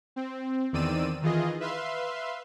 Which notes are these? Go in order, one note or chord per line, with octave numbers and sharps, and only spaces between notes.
C4
E2 D#3 C4 D5 E6 D#7
D#3 E3 F4 G#4 D#5
B4 E5 F5 C6